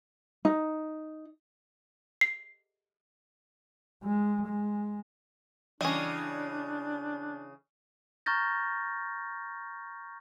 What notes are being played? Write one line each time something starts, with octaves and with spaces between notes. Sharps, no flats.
D#4
C7
G#3
G#3
C#3 E3 G3 C#4 D4 D#5
A#5 C#6 F6 G6 A6 A#6